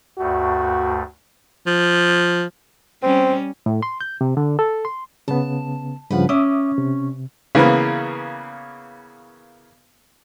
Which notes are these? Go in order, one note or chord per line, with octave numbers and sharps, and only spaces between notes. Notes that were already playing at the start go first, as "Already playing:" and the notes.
D2 G2 A3 F#4
F3
G3 C4 C#4
A2
C6
G6
C3
D3
A4
C6
C#3 B3 A5
G2 C#3 F3 B4 F#5
C#4 E5 D6 D#6
C3
C#3 E3 A#3 B3